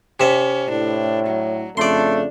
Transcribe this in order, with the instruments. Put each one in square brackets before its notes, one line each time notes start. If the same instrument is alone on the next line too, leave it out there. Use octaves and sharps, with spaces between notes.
[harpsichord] C3 E5 [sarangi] C#4
[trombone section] A2 [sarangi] D4
[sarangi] F#3
[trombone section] F2 C#3 A3 [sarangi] D4 [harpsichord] D5 C6